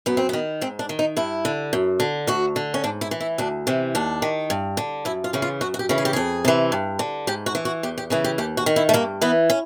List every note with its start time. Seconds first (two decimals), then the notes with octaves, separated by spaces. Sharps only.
0.06 F#2 B3
0.17 C4
0.29 D#3 B3
0.61 G#2 C4
0.79 D4
0.89 D#3
0.99 D#4
1.17 G2 E4
1.45 D3
1.73 F#2
2.00 D3
2.27 D2 F#4
2.56 D3
2.74 C#4
2.84 G#2 D4
3.01 E4
3.11 E3
3.21 E4
3.38 D2 D4
3.67 C3 E3
3.95 D#2 D4
4.22 D#3
4.50 G2
4.77 D3
5.05 F#2 E4
5.24 F4
5.33 C#3 E3
5.42 F4
5.61 F#2 F#4
5.74 F#4
5.79 G4
5.89 C#3 E3
5.98 G#4
6.05 G4
6.13 F2 G#4
6.45 C3 E3
6.72 G2
6.99 D3
7.27 G#2 G4
7.46 F#4
7.55 E3
7.65 F#4
7.83 E2 G4
7.98 G4
8.10 C#3 E3 G#4
8.24 G4
8.38 D#2 G4
8.57 F#4
8.66 D#3
8.76 E4
8.89 A3
8.94 G2 A#3
9.22 E3 B3
9.50 C#4